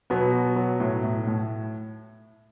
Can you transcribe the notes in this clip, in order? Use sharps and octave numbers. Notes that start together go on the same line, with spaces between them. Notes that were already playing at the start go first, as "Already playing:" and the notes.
B2 F#3 B3
F#3
F#3
A2
A2
A2